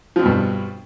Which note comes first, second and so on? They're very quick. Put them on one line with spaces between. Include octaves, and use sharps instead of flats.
F3 C4 B2 G2